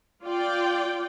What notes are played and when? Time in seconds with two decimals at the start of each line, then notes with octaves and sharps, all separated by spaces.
0.23 F4 D5 G5